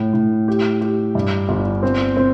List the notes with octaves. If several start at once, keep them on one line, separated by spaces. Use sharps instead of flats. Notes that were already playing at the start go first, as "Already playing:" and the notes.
Already playing: A2
A2
G4
G4
G2
G1
C4
C4